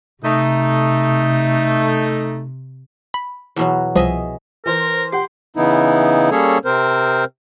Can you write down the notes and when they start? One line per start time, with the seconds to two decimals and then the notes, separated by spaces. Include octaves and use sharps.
0.23 C3 A3 D#4
3.14 B5
3.56 E2 B2 F#3
3.95 C2 F3 G#4 D#5 E5
4.66 E3 A#4 C5
5.12 G4 F#5 C6
5.56 C#3 E3 B3 D#4 E4
6.31 G3 A#3 C#4 G#4 A4 C#5
6.65 C3 C4 A#4 C5